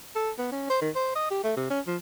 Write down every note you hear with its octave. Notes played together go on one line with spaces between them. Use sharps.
A4
B3
C#4
C5
D#3
C5
D#5
G4
A3
C3
C#4
F3